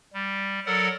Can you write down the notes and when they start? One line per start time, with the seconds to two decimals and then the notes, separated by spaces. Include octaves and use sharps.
0.14 G3
0.66 F#3 A4 A#4 D5 F#5